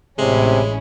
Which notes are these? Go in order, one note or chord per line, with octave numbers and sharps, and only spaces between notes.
A1 C3 G#3 C#4 E4